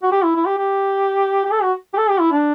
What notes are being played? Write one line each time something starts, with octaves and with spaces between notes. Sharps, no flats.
F#4
G4
E4
E4
G4
G4
G4
A4
F#4
G4
A4
G4
E4
D4